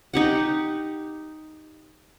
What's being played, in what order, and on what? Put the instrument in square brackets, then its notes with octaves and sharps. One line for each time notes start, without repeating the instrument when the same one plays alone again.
[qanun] D#4 G4 F#5